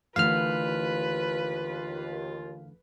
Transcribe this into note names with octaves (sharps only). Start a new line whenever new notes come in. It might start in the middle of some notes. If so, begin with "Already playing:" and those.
D#2 D3 E3 A3 F4 B4 F5 F6